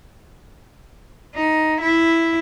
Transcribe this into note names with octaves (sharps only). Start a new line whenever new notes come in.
D#4
E4